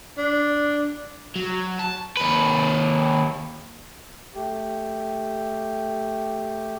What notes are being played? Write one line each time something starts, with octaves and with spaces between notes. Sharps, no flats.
D4
F#3
A5
D#2 B4
A3 G4